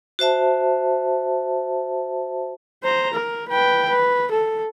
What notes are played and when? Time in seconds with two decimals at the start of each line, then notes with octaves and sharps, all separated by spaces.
0.19 F#4 C5 E5 A5
2.84 C5 A#5
3.14 A#4
3.49 B4 G5
3.89 B4
4.31 A4